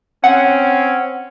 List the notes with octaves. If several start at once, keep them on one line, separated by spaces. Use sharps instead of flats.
C4 C#4 F#5